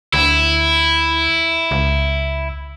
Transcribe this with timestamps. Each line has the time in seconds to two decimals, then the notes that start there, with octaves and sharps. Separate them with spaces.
0.13 D2 E4
1.71 C#2